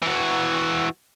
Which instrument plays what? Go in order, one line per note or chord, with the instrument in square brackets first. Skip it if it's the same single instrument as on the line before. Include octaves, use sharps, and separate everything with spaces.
[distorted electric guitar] E3 F#4